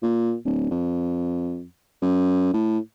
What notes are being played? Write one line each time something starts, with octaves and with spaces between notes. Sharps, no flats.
A#2
D1
F2
F#2
A2